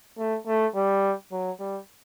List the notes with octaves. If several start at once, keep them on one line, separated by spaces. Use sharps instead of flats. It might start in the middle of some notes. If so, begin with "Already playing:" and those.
A3
A3
G3
F#3
G3